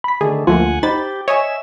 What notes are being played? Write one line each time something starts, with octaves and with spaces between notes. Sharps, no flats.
B5 B6
D3 D#3 A3 G#4
D2 F3 A3 A#3 F4 F#5 G#5
D#4 G4 C5 B5 A6
C#5 D#5 E5 G#5